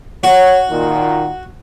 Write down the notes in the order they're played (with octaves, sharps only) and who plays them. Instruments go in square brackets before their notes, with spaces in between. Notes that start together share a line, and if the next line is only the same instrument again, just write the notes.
[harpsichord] F#4 [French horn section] C#5
[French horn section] A#2 D#3